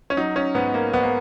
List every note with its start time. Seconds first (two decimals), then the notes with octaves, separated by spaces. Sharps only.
0.10 C#4
0.17 F#3 D#4
0.36 C#4
0.54 G#2 B3
0.74 A#3
0.93 G#2 B3
1.03 A#3